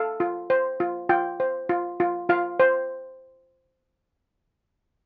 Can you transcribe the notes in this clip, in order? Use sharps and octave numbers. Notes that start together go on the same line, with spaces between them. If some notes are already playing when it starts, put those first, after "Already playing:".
Already playing: A4 F5
F4
C5
F4
F4 G5
C5
F4
F4
F4 F5
C5